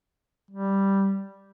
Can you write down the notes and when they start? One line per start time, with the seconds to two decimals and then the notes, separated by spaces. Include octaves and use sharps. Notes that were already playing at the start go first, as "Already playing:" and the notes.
0.51 G3